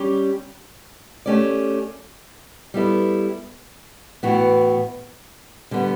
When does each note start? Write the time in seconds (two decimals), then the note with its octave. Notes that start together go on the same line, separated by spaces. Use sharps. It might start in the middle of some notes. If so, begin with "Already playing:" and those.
Already playing: G3 C#4 G4 D5
1.26 A3 C#4 G4 D5
2.74 G3 B3 E4 A4
4.23 A2 E3 B3 F#4
5.71 D3 G3 B3